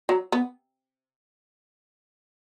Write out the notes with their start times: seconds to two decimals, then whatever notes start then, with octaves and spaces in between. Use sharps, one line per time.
0.09 F#3
0.32 B3